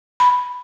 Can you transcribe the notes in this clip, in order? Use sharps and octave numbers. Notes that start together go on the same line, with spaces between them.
B5